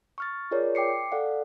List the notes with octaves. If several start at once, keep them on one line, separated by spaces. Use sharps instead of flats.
C#6 F6 A6
F4 G#4 A#4 C#5 D5
G5 D6 C7 C#7
A4 D5 F5 F#5